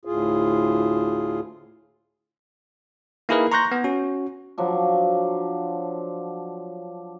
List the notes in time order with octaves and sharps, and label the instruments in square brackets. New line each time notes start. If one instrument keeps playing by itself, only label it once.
[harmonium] D2 A2 F4 G#4
[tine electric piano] A#3 D#4 E4 G#4 A#4 B4
A#5 C6 C#6 F#6 G6 A#6
B3
C#4 F#4
[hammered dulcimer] F3 F#3 D4